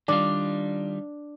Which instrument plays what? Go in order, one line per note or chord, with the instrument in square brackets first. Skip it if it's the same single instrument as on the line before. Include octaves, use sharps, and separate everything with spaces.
[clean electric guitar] D#3 G3 F4 [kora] D4